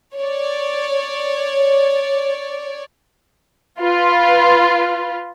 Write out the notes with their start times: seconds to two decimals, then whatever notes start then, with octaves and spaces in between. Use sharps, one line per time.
0.15 C#5 D5
3.81 F4 B4